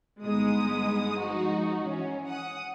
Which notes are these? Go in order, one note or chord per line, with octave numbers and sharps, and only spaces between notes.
G1 G#3 B3 D#4 D#6
F3 G#3 D#4 F#4
E3 C#4
F#5 D#6